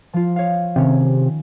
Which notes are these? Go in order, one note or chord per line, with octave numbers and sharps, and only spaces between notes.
F3 F4
C#5 F5
C3 D#3 C#4